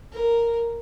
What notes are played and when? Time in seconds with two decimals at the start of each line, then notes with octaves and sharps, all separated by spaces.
0.13 A#4